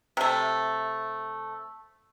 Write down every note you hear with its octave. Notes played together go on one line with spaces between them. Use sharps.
C3 A3